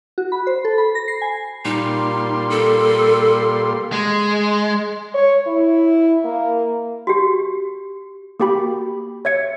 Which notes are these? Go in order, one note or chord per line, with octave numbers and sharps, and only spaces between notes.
F#4
B5
C5
A4
B5
A#6
C7
G#5
A#2 G3 D#4 C6
A4
G#3
C#5
E4
A#3
F#4 G4
A#3 F#4 G4 G5 B5
C#5 E5 G#6 C#7